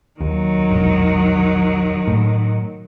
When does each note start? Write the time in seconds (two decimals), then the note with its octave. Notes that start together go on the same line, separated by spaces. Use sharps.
0.21 D#2 D#3 F#3
0.71 E1 A#1
2.08 A2